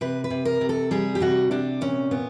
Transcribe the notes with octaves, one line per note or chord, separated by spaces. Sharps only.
C3 B4
B4
C3
A#4
C3
A4
G3 G#4
G4
C3 F#4
C3 D4
A#2 C#4
A#2 B3